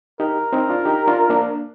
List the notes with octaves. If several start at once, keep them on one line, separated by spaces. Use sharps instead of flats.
D#4 G4 A#4
C4 D#4
D4 F4
D#4 G4
D4 F4
A#3 D4